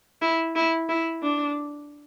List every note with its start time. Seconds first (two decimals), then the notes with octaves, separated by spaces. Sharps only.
0.22 E4
0.56 E4
0.89 E4
1.22 D4